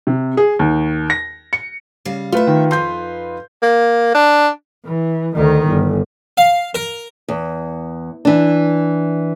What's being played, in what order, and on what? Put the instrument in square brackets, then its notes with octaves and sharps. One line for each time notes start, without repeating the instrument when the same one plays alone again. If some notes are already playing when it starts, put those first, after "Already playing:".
[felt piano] C3
G#4
D#2
A#6
C#7
[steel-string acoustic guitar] C#3 G3 F5
[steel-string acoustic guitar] A3 E5 [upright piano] F4 B4
[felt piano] D#3
[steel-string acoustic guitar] F2 D#4 [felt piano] C6 G6
[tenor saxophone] A#3
D4
[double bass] E3
D2 D#3
G1
[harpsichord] F5
A#4
[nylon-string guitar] E2
E3 D4